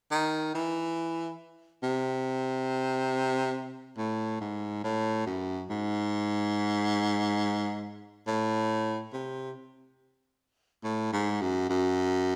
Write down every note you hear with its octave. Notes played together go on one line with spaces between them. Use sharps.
D#3
E3
C3
A2
G#2
A2
F#2
G#2
A2
C3
A2
G#2
F#2
F#2